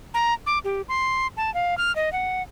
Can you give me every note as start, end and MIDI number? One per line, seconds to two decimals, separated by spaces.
0.14 0.34 82
0.46 0.59 86
0.64 0.82 67
0.89 1.27 84
1.37 1.52 81
1.54 1.77 77
1.78 1.94 89
1.96 2.12 75
2.13 2.43 78